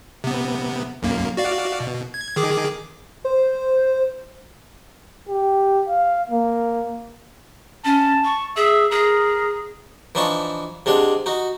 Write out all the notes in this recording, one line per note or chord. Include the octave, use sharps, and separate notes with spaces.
C3 B3
B1 F#2 A#3
F#4 D5 F5
B2
G#6
D#3 G#4 D6
C5
G4
F5
A#3
C#4 A5
C#6
G#4 E5
G#4 A#4
E3 F3 D4 D#4 A5 C#6
C3 G#3 D4 F#5
D#4 F#4